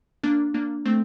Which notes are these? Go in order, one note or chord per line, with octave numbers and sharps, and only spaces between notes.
A#3 D4
A#3 D4
A3 C4